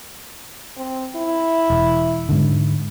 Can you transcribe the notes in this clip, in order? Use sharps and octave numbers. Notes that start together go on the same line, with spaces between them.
C4
E4
E1
G#2 D3